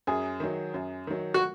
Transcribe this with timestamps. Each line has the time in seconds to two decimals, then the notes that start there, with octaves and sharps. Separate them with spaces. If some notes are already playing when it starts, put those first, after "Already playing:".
0.07 F#2 G#4
0.40 D#3 F#3
0.74 F#2
1.07 D#3 F#3
1.34 F#4